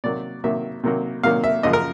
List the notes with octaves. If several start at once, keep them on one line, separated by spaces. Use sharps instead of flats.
C3 D#3 F#3 A#3 D5
C3 D#3 F#3 A#3 E5
C3 D#3 F#3 A#3
C3 D#3 F#3 A#3 F5
E5
F#2 C#3 F3 D#5
A#4